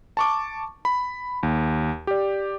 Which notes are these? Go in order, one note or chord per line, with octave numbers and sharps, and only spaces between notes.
A5 C#6 D6
B5
D#2
G4 D5